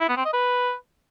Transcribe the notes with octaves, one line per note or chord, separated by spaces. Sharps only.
E4
B3
C4
D#5
B4